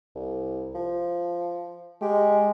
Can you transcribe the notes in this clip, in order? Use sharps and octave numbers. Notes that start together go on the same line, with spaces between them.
C2
F3
G#3 G4